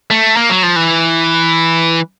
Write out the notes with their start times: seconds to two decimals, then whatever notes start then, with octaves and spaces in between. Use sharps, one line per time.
0.11 A3
0.36 A#3
0.50 F#3
0.63 F3
0.76 E3